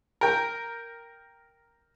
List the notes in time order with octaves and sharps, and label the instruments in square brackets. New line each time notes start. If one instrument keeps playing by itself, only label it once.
[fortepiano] A#4 G5